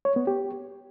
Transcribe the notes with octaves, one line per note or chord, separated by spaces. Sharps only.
C#5
B3
G4